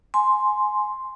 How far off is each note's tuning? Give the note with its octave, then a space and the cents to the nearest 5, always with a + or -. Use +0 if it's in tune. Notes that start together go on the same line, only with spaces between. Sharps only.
G#5 +15 C6 +0